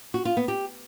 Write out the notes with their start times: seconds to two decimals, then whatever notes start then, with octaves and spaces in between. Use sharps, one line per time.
0.14 F#4
0.25 F4
0.37 B3
0.48 G4